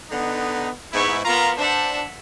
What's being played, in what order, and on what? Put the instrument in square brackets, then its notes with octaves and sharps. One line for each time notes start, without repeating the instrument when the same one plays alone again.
[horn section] D3 B3 D#4
[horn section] G#2 E4 [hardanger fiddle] B3 C#6
[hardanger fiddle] B3 A#4 [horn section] F4 A#5
[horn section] D4 C5 [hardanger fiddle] E5 F#5